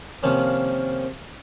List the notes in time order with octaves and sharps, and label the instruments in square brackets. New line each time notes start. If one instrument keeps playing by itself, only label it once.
[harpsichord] C3 D#3 F3 A#3 C#4